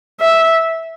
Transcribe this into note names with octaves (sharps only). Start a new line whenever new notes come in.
E5